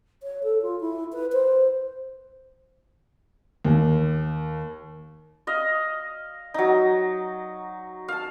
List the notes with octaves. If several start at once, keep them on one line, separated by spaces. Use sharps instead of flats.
C#5
A4
F4
E4
B4
C5
D#2
D#5 F5
F#3 D#4
F5 A5